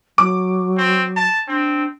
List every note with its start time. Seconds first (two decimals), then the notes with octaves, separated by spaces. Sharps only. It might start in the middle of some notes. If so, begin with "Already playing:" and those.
0.18 F#3 D6
0.78 C4
1.16 A5
1.48 C4 D4